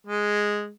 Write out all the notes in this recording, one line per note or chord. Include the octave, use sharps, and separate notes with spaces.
G#3